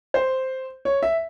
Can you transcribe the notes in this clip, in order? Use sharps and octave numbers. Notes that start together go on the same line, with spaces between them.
C5
C#5
E5